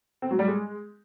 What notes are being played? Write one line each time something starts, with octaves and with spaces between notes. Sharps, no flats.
C4
F#3
G3
G#3